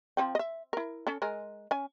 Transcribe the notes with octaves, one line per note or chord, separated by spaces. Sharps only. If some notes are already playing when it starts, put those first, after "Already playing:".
F3 C4 G5
D#5 E5
E4 A#4
C#4 A4
G#3 A#4 G#5
C#4 G#5